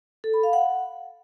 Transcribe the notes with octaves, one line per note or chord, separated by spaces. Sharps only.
A4
B5
F5
F#5